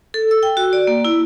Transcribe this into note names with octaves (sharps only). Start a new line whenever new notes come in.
A4
E6
G5
F#4
D5
A#3
E4